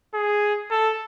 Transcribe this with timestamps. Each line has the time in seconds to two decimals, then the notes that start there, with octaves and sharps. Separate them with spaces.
0.14 G#4
0.71 A4